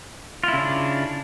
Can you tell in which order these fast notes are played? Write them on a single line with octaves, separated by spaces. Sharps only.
F4 E4 C#3 D4